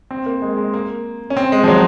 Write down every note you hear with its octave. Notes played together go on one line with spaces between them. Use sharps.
C4
A#3
G#3
G#3
A#3
C#4
C4
G#3
F3
F#3